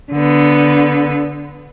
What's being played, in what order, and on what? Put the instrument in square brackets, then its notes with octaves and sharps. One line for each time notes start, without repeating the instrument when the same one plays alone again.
[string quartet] D3 B3